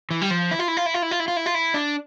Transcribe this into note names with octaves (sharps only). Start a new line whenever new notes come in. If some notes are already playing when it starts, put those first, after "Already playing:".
E3
G3
F3
E4
F4
E4
F4
E4
F4
E4
F4
E4
F4
E4
F4
E4
D4